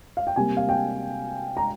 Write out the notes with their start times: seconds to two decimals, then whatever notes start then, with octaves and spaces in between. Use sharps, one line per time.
0.17 F5
0.27 G5
0.36 C3 G3 A#3 G#5
0.57 F5
0.69 G5
1.57 A#5